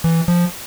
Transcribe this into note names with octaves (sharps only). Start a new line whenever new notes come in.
E3
F3